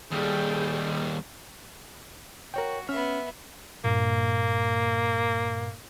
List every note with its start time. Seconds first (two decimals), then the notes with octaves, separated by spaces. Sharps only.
0.11 D#2 G3 G#4 A4 G5
2.54 F#4 A#4 C#5 G5
2.89 B3 C#4 E5 F6
3.84 G2 A#2 A#3